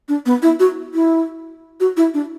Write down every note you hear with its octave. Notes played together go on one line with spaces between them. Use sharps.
D4
B3
E4
F#4
E4
F#4
E4
D4